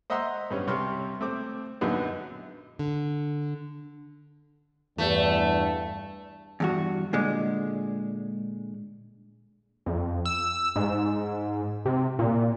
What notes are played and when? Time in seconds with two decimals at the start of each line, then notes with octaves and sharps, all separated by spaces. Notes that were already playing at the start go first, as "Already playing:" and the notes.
0.10 C5 D#5 E5 F#5 A#5 C6
0.50 G2 G3 B3 C#4
0.67 C2 C3 G3 C#5 C6 F6
1.21 A3 C4 D6
1.81 A#1 F#2 D3 F#3 B3 D#4
2.79 D3
4.98 E2 G2 A3
6.60 E2 G2 F#4
7.13 A#2 D3 G#3
9.86 F2
10.25 E6
10.76 G#2
11.85 C3
12.19 A#2